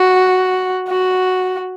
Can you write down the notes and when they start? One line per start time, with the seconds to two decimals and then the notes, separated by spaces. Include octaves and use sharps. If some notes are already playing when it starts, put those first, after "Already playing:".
Already playing: F#4
0.88 F#4